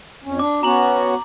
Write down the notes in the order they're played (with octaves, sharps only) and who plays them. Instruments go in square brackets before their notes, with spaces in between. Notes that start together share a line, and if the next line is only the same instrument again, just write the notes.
[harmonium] F2 C#4
[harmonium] D4 [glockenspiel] D6
[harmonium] B3 C#4 F#4 [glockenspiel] A#5 F#7